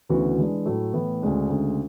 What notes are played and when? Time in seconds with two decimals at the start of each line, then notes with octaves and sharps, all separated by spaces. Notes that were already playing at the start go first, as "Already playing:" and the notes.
0.09 D2 C#3 E3 B3 F#4
0.38 E3 G#3 D4
0.66 A2 F#3 A3
0.93 A2 E3 B3
1.22 D2 C#3 G#3 D4
1.50 D2 C#3 G#3